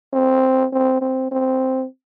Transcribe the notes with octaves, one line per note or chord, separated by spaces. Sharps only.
C4
C4
C4
C4